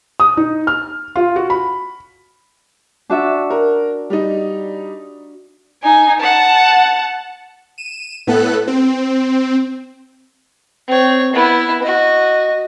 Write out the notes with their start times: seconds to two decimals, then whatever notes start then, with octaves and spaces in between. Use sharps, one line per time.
0.20 D#6
0.37 D#4
0.67 F6
1.16 F4
1.36 F#4
1.50 B5
3.10 D4 F#4 E5
3.50 A#4
4.10 G3 D#4
5.83 D#4 G#5
6.20 F#5 A5
7.78 D#7 E7
8.27 A2 B3 A4 F#6
8.68 C4
10.88 C4 C#5
11.33 B3 E4
11.83 F#4 D#5